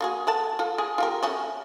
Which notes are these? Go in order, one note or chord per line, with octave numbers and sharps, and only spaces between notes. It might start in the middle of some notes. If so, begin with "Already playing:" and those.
A#3 F#4 G#4
A4 F#5 A5
F4 A4
G#4
F4 G4 A#4
A3 C#4 F#4